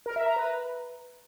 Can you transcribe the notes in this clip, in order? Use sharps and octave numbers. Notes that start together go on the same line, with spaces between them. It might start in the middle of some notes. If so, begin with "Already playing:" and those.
A#4
E5
A#5
B4